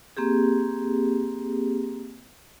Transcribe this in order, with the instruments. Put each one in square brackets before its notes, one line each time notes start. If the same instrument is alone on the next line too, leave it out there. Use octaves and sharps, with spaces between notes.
[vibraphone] A#3 C4 G4 G#4